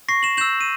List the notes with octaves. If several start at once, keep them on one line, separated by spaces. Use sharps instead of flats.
C#6 A#6 C7
E7 F#7
E6 G6 E7 F#7
D#7